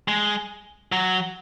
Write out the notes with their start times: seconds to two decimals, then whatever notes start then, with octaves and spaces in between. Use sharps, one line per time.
0.08 G#3
0.92 F#3